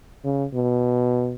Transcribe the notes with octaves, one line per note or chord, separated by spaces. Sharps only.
C#3
B2